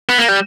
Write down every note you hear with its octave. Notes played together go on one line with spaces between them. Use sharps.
B3
A#3
G3